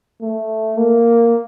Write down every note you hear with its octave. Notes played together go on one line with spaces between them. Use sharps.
A3
A#3